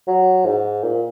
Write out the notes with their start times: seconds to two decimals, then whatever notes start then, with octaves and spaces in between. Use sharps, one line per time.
0.08 F#3
0.46 G#2
0.83 A#2